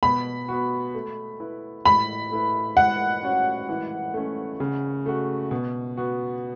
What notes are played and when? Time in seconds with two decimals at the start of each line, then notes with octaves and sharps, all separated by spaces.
0.03 B2 B5
0.48 B3 F#4
0.94 A3
1.40 E4 B4
1.85 A2 B5
2.31 A3 E4 B4
2.77 E3 F#5
3.23 C#4 F#4 C#5
3.69 E3
4.14 A3 C#4
4.60 C#3
5.06 A3 F#4
5.51 B2
5.97 B3 F#4